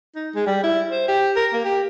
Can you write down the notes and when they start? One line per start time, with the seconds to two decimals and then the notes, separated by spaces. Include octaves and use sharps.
0.15 D#4
0.35 G#3
0.47 G3
0.64 E4
0.90 C5
1.08 G4
1.36 A#4
1.53 A#3
1.65 G4